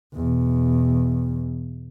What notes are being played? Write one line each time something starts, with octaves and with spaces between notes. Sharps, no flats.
E2 B2